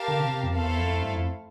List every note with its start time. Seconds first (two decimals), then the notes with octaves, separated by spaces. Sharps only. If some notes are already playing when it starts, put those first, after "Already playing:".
Already playing: G4 A#4 F5 A5
0.08 D3
0.19 C3
0.30 C3
0.43 F2
0.54 E2 A3 E4 A4 C5 F5
0.66 E2
0.78 F2
0.90 F2
1.02 G2
1.14 F2